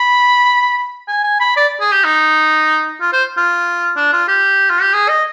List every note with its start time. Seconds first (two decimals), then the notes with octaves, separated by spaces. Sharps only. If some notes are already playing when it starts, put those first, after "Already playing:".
Already playing: B5
1.08 G#5
1.23 G#5
1.40 B5
1.56 D5
1.80 G#4
1.92 G4
2.04 D#4
3.01 F4
3.13 C5
3.37 F4
3.96 D4
4.13 F4
4.28 G4
4.70 F4
4.82 G4
4.93 G#4
5.09 D#5